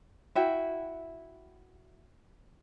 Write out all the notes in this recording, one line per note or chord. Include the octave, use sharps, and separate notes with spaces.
E4 F#4 E5 G5